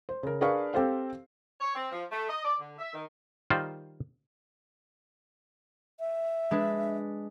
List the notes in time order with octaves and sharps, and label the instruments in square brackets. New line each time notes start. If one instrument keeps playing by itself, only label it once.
[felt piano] C5
C#3 A#4
D4 G#4 A#4 B4 F5 C#6
C4 G4 A4 C5 F5
[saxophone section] C#5
C4
F3
A3
D#5
D5
D3
E5
D#3
[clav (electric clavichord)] D#3 G3 F4 A#4 C5
[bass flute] E5
[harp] G#3 D4 B4